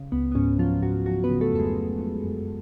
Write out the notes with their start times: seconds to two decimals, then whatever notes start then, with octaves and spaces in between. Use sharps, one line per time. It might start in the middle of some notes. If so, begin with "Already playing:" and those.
Already playing: C#3
0.12 C#2 B3
0.32 B3
0.35 G#2 C#4
0.59 F3 F#3 F4
0.82 G#2 F#3 F#4
1.06 F3 F#3 F#4
1.24 B3 B4
1.30 C#3
1.41 A3 A4
1.52 F2 A4
1.59 G#3 G#4
1.76 G#3
1.99 F3
2.23 F#2